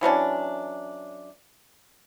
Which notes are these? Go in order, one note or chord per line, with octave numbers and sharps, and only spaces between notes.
E3 F#3 C#4 D4